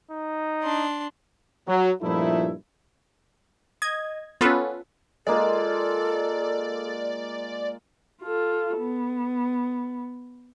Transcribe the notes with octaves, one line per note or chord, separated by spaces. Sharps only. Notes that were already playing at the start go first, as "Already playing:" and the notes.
D#4
D4 C6
F#3
G2 A#2 F3 A3 D#4 E4
D#5 G#6
B3 C#4 F4 A4 B4
G#3 A#3 F4 A4 D5
F4 A4
B3